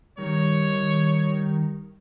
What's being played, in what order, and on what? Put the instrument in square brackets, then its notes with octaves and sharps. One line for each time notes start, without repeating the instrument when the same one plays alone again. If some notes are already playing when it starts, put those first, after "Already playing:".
[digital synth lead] D#3 [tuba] G3 [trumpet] C#5